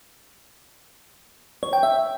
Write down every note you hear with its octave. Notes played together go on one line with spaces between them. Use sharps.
C#5
G5
E5